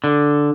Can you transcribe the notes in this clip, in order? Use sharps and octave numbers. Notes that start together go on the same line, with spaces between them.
D3